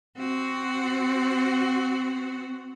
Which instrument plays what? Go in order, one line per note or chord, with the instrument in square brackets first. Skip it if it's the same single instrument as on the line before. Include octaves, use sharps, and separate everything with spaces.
[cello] C4 F#4